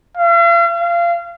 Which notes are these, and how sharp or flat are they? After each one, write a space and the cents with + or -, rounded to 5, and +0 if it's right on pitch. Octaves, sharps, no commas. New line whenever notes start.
F5 -45
F5 -25